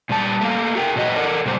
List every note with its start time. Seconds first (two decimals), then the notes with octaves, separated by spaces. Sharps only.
0.09 A#2 G3 A5
0.41 A3 A#3 F5
0.75 F#4 G#4 A#4 G5
0.96 A#2 F#3 G#4 D#5 F#5
1.16 A4 A#4 D5 F#5
1.45 A#2 C#3 G3 B4 C5